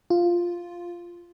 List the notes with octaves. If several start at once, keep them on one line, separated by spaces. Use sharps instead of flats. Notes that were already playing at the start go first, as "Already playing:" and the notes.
F4